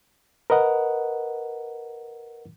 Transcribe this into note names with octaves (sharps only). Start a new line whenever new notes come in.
A#4 B4 D#5 F#5